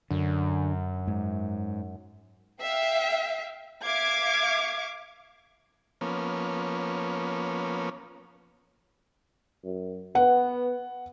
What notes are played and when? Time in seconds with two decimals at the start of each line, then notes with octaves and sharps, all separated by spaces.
0.11 F#2 D3
1.07 G#2
2.61 E5 F5 G5
3.84 E5 F5 D6 G#6
6.01 F3 A#3 B3 C#4
9.64 F#2
10.15 B3 B4 F#5